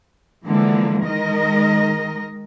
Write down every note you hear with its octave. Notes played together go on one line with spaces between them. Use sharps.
D3 E3 F3 G#3 A#3
D#3 G#3 A#4 D#5